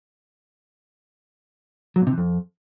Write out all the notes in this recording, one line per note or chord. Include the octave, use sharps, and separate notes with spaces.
F#3
A#2
C3
E3
F2